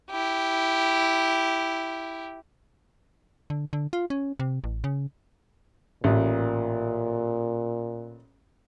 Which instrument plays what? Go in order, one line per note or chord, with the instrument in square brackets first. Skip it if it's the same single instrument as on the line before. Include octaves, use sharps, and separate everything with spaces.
[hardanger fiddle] E4 G4
[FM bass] D3
D3
F4
C#4
C3
A1
C#3
[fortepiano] A1 [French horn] A#2